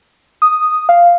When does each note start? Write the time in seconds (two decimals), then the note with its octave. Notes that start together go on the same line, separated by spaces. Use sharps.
0.42 D#6
0.89 F5